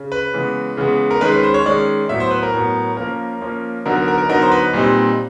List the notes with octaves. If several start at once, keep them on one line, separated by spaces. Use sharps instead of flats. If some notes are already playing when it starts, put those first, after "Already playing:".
Already playing: C#3
B4
C#3 E3 G#3 B3
C#3 E3 G#3 B3
A#4
D#3 G#3 C#4 B4
B4
C5
C#5
D#3 G#3 C#4 D5
A2 F#3 B3 E5
C5
B4
A#4
A2 F#3 B3
F3 A#3 C#4 A#4
F3 A#3 C#4
D3 F#3 B3 D#4 A#4
A#4
A#4
A#4
D3 F#3 B3 D#4 A#4
C5
B4
A#2 G3 C4 D#4